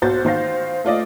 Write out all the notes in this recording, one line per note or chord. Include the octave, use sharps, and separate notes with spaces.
B1 F#4 C5 G6 A6
D#3 C5 F5 A#6
A3 F4 D5 D#5